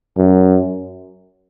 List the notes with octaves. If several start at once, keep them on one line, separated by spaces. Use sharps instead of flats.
F#2